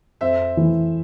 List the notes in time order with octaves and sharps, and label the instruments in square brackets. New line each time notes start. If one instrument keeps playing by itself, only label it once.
[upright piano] F2 [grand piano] C5 E5
[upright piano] E3 A3 E4